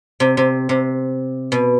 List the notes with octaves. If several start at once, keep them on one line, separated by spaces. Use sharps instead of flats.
C3
C3
C3
B2